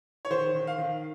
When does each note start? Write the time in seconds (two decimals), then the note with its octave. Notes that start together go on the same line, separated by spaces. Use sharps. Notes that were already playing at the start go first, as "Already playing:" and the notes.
0.25 C#5
0.30 D#3 C5
0.55 D#3
0.67 F5
0.78 D#3